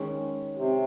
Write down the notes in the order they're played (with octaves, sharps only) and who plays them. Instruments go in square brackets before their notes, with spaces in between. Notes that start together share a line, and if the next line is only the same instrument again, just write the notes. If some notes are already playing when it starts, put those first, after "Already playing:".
Already playing: [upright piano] D#3 G#3 C#4
[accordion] C3